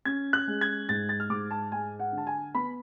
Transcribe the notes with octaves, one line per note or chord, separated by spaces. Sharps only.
C#4 G#6
F#6
G#3
G#6
G#2 A6
A6
F6
G#2 D6
A5
G#3 G#5
F#5
D3
A5
G#5
B3 B5